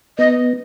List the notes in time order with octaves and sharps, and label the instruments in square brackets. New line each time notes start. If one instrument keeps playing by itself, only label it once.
[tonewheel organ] B3 [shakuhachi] D#5